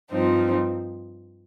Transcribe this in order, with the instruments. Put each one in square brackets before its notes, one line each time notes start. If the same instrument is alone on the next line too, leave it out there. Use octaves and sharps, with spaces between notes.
[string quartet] G2 F3 C4 D#4